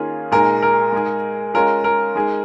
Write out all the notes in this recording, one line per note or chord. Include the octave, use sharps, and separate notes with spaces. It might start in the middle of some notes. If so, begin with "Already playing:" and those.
Already playing: D#3 A#3 C#4 F4 G#4
A#2 G#3 D#4 G#4 A#4
A#4
G#3 D#4 G#4
G#3 C#4 F4 G#4 A#4
A#4
G#3 D#4 G#4